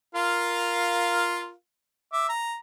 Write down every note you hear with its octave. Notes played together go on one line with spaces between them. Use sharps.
F4 A#4 F5
E5 D6
A#5